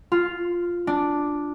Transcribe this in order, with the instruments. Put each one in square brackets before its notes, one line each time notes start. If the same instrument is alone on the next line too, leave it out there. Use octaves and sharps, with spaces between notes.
[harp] F4
D4